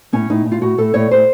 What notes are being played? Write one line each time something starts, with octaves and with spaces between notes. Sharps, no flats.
A2 C#4
A2 D#4
A2
F4
A2 F#4
A2 A4
A2 C#5
A2 C5